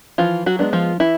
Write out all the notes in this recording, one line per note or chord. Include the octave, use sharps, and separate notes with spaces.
E3 F3 F4
F#3 F#4
G#3 B3 D4
F3 F4
E3 E4